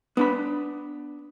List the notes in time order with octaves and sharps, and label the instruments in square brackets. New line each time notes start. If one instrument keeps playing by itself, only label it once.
[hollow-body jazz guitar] B3 D4 B5